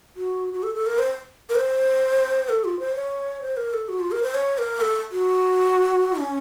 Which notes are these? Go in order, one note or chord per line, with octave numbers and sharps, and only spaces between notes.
F#4
F#4
A4
A4
A#4
C5
A#4
C5
A4
F4
C5
C#5
C5
A#4
A4
F#4
F4
A#4
C5
C#5
A#4
A4
F#4
C#4